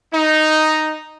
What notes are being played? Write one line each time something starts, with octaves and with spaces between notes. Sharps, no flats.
D#4